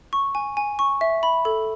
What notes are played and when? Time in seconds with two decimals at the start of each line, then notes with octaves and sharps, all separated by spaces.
0.13 C#6
0.35 G#5
0.57 G#5
0.79 C#6
1.01 E5
1.23 B5
1.45 A4